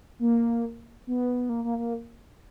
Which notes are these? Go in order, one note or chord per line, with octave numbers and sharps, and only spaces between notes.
A#3
B3
A#3
A#3
A#3